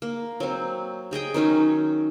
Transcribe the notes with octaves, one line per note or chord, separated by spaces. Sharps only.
A#3
F#3 C4
G4 G#4 D#5 G5
D#3 F#3 C#4 D#4